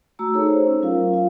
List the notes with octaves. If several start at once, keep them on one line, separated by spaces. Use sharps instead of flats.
A3 F#4 A#5 E6
D#4 G#4 A4 C#5
C5
C#4
F#3 F4 A#4 F5
F4 F5